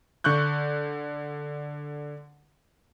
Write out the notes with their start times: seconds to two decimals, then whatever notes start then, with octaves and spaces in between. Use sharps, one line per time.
0.24 D3 C#6 F#6 G6